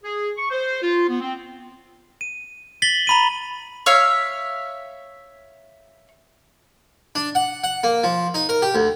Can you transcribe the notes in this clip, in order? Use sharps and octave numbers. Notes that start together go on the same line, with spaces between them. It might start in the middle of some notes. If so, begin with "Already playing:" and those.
G#4
C#6
C5
F4
B3
C4
D#7
A6 B6 F#7 G7
A#5 B5 D#7
C#5 E5 F5
D4
F#5
F#5
A#3
F3
D#4
A#4
G4
D2